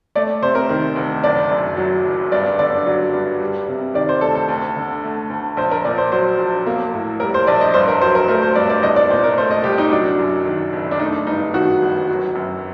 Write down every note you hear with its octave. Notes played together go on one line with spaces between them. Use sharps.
A3 D5
C3 C5
A#4
D#3
D2
F#1 D5
F#2
F#3
F#1
G2 D5
D3 D5
F#3
G2
G3
C3
D#3 D5
C5
D2 A4
A4
D2
D3
A3
D2
A#1 C5
A#4
A#2 D5
C5
F#3 C5
A#1
A#3
A2
G3 A#4
C5
A#1 D5
D#5
G2 C5
A#4
F#3 C5
A#4
A3 A#4
C5
G2 D5
D5
C2 D#5
D5
A#2 C5
A#4
A3 C5
D#5
C2 G4
D#4
F#3 D4
F#2
D#3
F#1
D4
A3 D#4
G2 D#4
D#3 F#4
G1
F#3
F#2